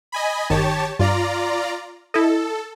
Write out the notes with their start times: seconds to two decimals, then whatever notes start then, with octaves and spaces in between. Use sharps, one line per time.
0.12 D#5 G#5 B5
0.50 G1 D#3 G4 C#5 A5
0.99 G2 F4 D5 A#5
2.14 E4 A4 D#5